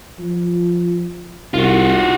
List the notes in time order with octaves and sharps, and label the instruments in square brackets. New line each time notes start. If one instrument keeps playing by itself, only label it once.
[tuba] F3
[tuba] C2 [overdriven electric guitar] F4 F#4